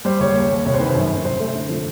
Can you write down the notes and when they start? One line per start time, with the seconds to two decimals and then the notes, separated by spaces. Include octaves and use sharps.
0.05 G3 C5
0.20 F#1 C#5
0.36 D#2
0.50 D#2
0.65 C2 C#5
0.74 C5
0.80 D#3 B4
0.90 C5
0.95 F#2
1.11 F#2
1.25 C2 C5
1.40 A3
1.55 D3
1.70 F3